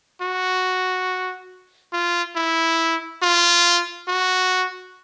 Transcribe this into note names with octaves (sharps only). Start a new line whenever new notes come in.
F#4
F4
E4
F4
F#4